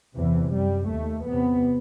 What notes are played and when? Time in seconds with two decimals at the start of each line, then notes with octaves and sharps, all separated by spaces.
0.16 E2 C3 E3
0.53 F#2 G3
0.90 D#2 A3
1.27 E2 C3 B3